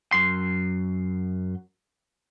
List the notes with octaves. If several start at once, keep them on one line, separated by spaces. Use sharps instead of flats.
F#2 C6